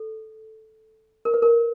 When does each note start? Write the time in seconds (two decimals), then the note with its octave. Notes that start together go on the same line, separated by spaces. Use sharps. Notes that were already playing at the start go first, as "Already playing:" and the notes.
Already playing: A4
1.25 A#4
1.34 B4
1.42 A#4